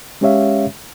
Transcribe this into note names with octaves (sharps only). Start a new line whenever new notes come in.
G#3 C#4 G4 C#5 E5 F5